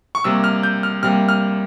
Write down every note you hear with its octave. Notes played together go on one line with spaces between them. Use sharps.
C#6
C3 G3 A#3 E6
F6
G6
F6
C3 G3 A#3 F6
F6